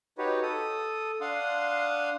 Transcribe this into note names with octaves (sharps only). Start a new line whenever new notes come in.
D#4 F#4 G4 B4 C#5
A4 D#6
D4 F5 F#5 C6 D#6